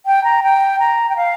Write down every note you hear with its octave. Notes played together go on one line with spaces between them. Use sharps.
G5
A#5
G5
A#5
G5
F5